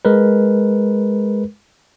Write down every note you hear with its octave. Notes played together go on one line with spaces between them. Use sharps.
G#3 A#4 B4